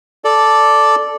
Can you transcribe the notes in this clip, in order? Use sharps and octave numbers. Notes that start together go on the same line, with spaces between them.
A4 D5